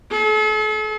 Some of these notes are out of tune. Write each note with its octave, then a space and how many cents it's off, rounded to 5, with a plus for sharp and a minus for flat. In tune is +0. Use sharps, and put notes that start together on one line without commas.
A4 -45